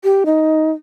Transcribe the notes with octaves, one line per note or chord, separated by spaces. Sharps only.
G4
D#4